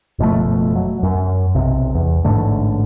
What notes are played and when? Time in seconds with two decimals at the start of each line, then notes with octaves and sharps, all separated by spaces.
0.19 F#1 B2 F3 A3
0.76 F#3
1.03 F#2
1.55 B1 C3
1.95 E2
2.24 A1 G#2 D3 A3